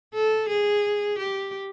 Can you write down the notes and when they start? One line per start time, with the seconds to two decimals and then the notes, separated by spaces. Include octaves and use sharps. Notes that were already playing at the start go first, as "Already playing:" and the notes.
0.14 A4
0.49 G#4
1.19 G4